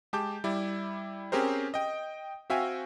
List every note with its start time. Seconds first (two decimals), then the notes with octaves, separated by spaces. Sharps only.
0.13 G#3 G4 A5 D6 G6
0.44 G3 E4 D5
1.32 C4 C#4 G4 G#4 A#4 C5
1.74 D#5 G5
2.50 C4 F#4 E5 F5 G5 G#5